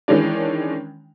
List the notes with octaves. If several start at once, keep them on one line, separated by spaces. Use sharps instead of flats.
D#3 E3 G#3 C#4 D4